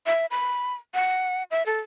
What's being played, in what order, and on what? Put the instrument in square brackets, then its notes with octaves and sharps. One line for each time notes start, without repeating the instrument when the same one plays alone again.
[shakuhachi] E5
B5
F#5
E5
A4